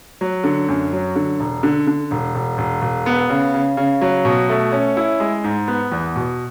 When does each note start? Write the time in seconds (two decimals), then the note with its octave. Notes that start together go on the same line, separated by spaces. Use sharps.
0.21 F#3
0.44 D3
0.68 F#2
0.93 F#3
1.16 D3
1.39 E1
1.63 D3
1.87 D3
2.11 E1
2.35 E1
2.58 E1
2.82 E1
3.06 B3
3.30 C#3
3.54 C#3
3.77 C#3
4.01 F#3
4.25 B2
4.49 A3
4.72 C#4
4.97 E4
5.20 G#3
5.44 G#2
5.68 B3
5.92 E2
6.16 B2